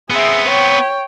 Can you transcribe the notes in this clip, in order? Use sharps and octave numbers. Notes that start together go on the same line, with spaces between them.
B3 C4 G#4 E5
C#5 G5